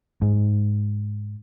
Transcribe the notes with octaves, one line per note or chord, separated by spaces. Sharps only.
G#2